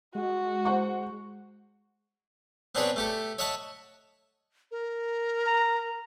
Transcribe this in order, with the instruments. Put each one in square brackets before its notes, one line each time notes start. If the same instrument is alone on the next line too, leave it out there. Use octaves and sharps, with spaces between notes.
[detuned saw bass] G#3 [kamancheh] F#4
[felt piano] C5 F#5 C#6
[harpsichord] B3 C4 D4 G#4 B4 C#5
A3 G4 A4
C#5 D#5 E5 F#5 A5
[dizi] A#4
[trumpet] A#5